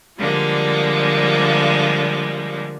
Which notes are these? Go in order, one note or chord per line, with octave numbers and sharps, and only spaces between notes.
D3 F3 G3 G#3 A#3